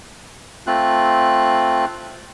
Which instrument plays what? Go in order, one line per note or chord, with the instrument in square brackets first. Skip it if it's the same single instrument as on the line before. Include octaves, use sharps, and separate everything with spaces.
[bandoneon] A3 C4 F4 F#6